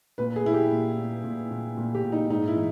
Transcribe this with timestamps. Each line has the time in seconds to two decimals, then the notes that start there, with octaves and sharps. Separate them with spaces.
0.18 A#2 B4
0.36 G#4
0.44 A#2 E4
0.54 G4
0.71 A#2
0.98 A#2
1.24 A#2
1.51 A#2
1.77 A#2
1.95 G4
2.04 A#2
2.12 D#4
2.30 G#2 D#4
2.48 E4
2.56 E3